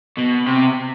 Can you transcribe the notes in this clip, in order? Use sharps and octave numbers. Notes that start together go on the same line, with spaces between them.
B2
C3